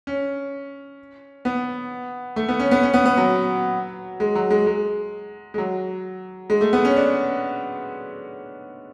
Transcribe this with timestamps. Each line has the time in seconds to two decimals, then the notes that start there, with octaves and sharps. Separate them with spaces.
0.07 C#4
1.45 B3
2.36 A3
2.48 B3
2.59 C#4
2.71 B3
2.83 C#4
2.94 B3
3.06 B3
3.17 F#3
4.20 G#3
4.35 F#3
4.50 G#3
4.67 G#3
5.54 G#3
5.58 F#3
6.50 G#3
6.61 A3
6.73 B3
6.85 C#4
6.96 D4